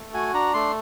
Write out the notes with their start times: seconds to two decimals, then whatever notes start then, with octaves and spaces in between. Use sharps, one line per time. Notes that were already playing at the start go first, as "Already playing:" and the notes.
Already playing: A3
0.14 F#4 G#5
0.34 D4 A#5
0.54 A3 C6